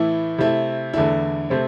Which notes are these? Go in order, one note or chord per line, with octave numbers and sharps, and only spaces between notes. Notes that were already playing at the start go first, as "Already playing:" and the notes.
Already playing: A2 E3 A3 E4
C3 A3 E4
E2 D3 A3 E4
C3 A3 C4